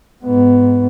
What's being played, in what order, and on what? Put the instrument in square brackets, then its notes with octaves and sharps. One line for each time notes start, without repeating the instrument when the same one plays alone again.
[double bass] G#2 B3